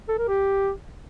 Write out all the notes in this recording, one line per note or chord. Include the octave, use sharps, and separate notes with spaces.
A4
A#4
G4